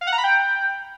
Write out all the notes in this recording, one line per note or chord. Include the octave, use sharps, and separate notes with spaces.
F5
F#5
A#5
B5
G5